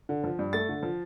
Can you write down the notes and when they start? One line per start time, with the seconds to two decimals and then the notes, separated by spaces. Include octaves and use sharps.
0.09 D3
0.24 F3
0.39 G2
0.53 A3 A6
0.69 D3
0.83 F3